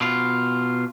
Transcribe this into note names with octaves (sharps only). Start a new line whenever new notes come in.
B2 F4